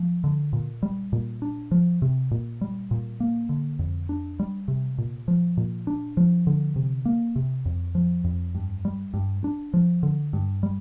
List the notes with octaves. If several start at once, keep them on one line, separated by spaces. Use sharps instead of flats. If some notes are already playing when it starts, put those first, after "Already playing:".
Already playing: F3
D3
A#2
G3
A#2
D4
F3
C3
A#2
G3
A#2
A#3
D3
F2
D4
G3
C3
A#2
F3
A#2
D4
F3
D3
C3
A#3
C3
F2
F3
F2
G2
G3
G2
D4
F3
D3
G2
G3